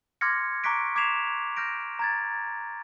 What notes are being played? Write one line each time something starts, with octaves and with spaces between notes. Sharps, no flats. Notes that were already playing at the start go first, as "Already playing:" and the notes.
C6 D6 F6 G#6 A#6 C#7
A#5 C#6 D6 F#6 B6 D7
D6 G#6 B6 C7 E7 F7
F6 G6 A#6 D7
A#5 G#6 A6